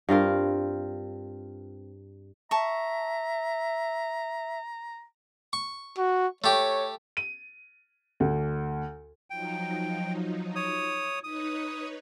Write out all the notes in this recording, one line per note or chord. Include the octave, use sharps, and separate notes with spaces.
G2 C4 F4 A#4
E5 A5 A#5 C#6
C#6
F#4
A3 G4 C#5
D#7
D2
F3 F#3 D#4 G5
C#5 D#6
D#4 B4 C#5 D#6